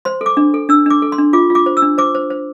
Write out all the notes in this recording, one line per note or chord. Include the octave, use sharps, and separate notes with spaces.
C5 C6
A4
D6
D4
A4
D4 E6
D4 D6
A4
C6
D4
F4 D6
F4
D6
C5
E6
D4
C5 D6
C5
C5